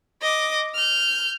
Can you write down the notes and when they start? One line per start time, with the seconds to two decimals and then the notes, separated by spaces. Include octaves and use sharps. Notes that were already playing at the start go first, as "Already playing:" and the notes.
0.22 D#5 D6
0.74 F6 G6